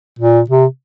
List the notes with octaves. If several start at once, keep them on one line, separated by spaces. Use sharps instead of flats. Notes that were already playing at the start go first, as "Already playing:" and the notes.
A#2
C3